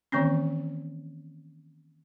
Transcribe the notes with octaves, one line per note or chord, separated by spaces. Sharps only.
D#3 E3 A#3 C4 C#4